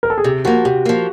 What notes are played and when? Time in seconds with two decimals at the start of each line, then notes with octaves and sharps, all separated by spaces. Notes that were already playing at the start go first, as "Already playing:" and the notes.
0.03 A#4
0.10 A4
0.18 G#4
0.24 C3 G4
0.45 F3 A#3 F#4
0.65 C3 G4
0.85 F3 A#3